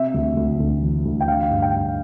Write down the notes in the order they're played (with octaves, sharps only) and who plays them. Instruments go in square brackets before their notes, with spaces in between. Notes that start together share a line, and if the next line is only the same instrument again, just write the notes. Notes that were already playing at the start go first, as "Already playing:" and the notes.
Already playing: [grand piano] C3 E5
D2
D2
D2
E3
D2
G5
D3 F5
G2
G5
G2